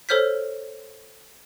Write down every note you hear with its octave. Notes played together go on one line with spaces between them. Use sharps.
A4 C5 C#5 F6 G6 B6